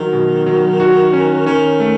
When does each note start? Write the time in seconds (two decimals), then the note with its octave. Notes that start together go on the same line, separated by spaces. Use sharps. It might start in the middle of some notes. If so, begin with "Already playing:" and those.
Already playing: D#3 F#3
0.13 B2
0.47 F#3
0.80 F#4
1.13 C#4
1.46 D#3 C#4
1.80 A3